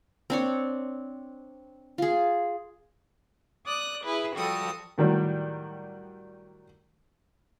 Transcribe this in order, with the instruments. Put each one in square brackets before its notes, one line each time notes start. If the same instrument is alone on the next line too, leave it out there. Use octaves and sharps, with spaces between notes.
[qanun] C4 D4 C#5
F4 G#4
[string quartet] D5 D#6 F#6
E4 G#4 B4
F3 G3 F#4 A4 D#6
[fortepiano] A2 D#3 F#3 G3